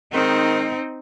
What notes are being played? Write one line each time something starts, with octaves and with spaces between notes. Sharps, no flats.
D#3 G#3 C4 D#4